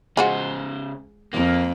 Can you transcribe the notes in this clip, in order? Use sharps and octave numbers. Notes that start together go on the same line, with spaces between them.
C#3 G#3 F4 F#4 C5
F2 A#3